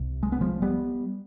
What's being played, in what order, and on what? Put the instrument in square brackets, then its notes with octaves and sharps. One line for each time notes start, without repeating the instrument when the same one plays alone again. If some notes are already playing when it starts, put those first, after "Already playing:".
Already playing: [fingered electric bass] C2 C3
G#3
B3
F3 G#3
G3 B3